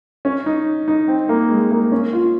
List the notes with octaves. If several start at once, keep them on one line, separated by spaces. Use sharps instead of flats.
C#4
D#4
D#4
C4
A#3
G#3
A#3
C#4
F4